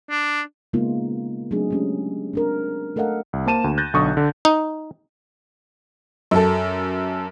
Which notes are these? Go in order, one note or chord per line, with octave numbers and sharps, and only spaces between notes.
D4
C#3 G#3 A#3 B3 D#4 F4
F#3 A3 C4 D4 D#4 G#4
G#3 C#4 G4
C4 D4 A#4
A3 A4 A#4 D#5 F5 F#5
C2
A#3 C5 A5 D#7 E7
D2
F#6 G6 A6 A#6
B1 D3 C#6 D#6
D3
D#4
F#2 A4